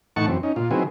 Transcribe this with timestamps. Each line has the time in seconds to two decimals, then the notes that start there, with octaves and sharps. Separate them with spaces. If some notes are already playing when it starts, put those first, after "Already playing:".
0.16 A2 E3 D#4 F#5 A5 C#6
0.28 F#2 E3 C4
0.43 C#4 D#4
0.56 A#2 F4
0.71 D#3 F#3 B3 C4 E4 G#4